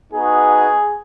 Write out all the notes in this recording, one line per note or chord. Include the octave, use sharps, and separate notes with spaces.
B3 D#4 F#4 G#4